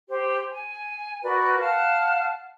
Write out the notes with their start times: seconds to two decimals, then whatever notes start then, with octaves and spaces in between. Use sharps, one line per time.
0.07 G4 C5
0.50 G#5
1.23 F#4 A#4 B4 D5
1.59 F5 F#5 A5 F6